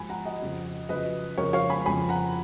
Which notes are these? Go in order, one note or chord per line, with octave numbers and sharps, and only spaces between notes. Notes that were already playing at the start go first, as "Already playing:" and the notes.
Already playing: G#2 F3 G#5 B5
F#5 A#5
D#5 F#5
F2 C#3 F3
F#2 C#3 F3 B4 D#5
F2 C#3 F3 A#4 C#5
C#5 F5
G#5 B5
F2 C#3 F3 G#5 B5
F#5 A#5